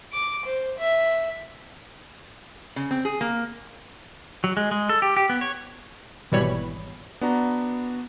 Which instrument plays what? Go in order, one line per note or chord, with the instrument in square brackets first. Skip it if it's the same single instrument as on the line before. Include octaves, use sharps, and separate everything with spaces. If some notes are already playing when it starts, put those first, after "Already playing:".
[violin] D6
C5
E5
[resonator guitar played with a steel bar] C#3
C4
G#4
A#3
[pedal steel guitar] F#3
G#3
G#3
A4
G4
G4
B3
C#5
[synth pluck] G#1 B2 E3 G3 C#5 B5
[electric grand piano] B3 D4 F#4 A#5